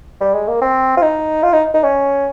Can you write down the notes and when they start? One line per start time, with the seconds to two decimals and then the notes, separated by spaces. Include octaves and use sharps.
0.21 G3
0.34 G#3
0.48 A#3
0.61 C4
0.97 F4
1.02 D#4
1.43 F4
1.53 D#4
1.74 D#4
1.84 C#4